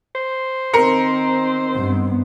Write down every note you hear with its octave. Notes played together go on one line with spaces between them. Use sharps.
C5
D#3 C4 A#4 C#7
G2 B3